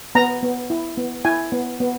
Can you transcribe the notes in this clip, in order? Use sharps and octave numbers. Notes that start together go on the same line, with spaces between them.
B3 A#5
B3
E4
B3
E4 G#5
B3
B3